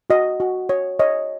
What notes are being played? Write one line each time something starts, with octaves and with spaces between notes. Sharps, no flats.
F#4 D#5
F#4
C#5
C#5 D#5